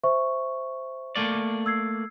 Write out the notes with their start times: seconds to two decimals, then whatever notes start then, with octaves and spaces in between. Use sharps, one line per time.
0.04 C5 E5 C#6
1.16 A3 A#3 D5
1.66 E6 G#6 C7